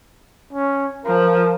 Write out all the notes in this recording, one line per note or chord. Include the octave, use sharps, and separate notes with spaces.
C#4
F3 A#4